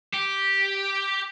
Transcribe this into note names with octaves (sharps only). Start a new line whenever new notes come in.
G4